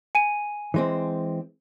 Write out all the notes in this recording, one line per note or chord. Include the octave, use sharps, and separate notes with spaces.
G#5 D#7
E3 G#3 C4